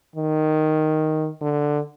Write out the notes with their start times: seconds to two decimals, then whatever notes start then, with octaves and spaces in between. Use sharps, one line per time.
0.16 D#3
1.41 D3